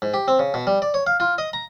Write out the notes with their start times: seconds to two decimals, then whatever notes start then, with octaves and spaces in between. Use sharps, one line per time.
0.02 G#2
0.14 G4
0.28 C4
0.39 C#3
0.54 B2
0.67 G3
0.82 D5
0.94 C#5
1.07 F5
1.20 F4
1.38 D#5
1.53 A#5